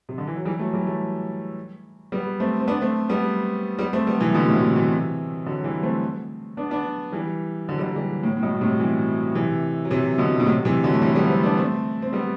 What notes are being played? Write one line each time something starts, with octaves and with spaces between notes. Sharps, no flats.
C3
D3
E3
F#3
E3 G3
F#3 A3
E3 G3
F#3 A3
G3 B3
A3 C4
C4
B3 D4
A3 C4
G3 B3
G3 B3
A3 C4
G3 B3
C3 E3
B2 D3
A2 C3
A2 C3
C3 E3
D3 F#3
E3 G3
A3 C4
B3 D4
B3 D4
E3 G3
D3 F#3
G3
D3 F#3
E3 G3
A2
A2
G2 B2
A2 C3
C3 E3
C3 E3
F#3
C3 E3
B2 D3
B2
A2 C3
C3 E3
D3 F#3
A3
E3 G3
G3 B3
A3 C4
B3 D4
A3 C4
C4
G3 B3